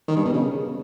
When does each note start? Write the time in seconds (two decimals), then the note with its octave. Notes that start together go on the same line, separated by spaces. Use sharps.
0.08 D#3
0.16 G2
0.25 B2
0.33 C#3